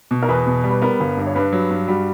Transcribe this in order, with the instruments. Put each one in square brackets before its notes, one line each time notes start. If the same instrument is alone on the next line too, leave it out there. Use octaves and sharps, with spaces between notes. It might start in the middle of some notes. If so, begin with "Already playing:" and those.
[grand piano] B2
[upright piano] A#4
[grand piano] E2 [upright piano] B4
[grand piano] B2
G3
[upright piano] B4
[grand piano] B3 [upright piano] A#4
[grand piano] G1
G2
[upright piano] C#5
[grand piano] G2 [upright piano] B4
[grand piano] F#3
G2
[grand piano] G3 [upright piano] F#4